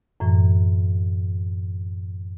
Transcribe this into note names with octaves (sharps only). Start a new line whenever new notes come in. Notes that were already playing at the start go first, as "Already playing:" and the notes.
F#2 A2 E3